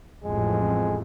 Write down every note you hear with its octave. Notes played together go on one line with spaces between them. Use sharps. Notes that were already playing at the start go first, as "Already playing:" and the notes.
A1 F2 G#3